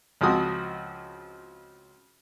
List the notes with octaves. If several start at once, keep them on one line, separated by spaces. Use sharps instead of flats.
C#2 F3 G#3 C4 F#4 D#6